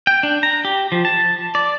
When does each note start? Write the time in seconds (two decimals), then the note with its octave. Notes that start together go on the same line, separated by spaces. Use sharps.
0.07 G5
0.23 D4
0.43 A#5
0.65 G4
0.92 F3
1.05 A5
1.55 D5